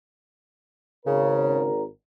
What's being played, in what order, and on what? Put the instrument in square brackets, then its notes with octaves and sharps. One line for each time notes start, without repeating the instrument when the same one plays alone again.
[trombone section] G#1 A#4 [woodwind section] C#3